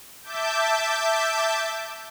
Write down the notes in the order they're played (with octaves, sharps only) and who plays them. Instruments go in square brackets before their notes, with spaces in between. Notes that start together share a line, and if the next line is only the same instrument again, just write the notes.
[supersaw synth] E5 A5 D6 G6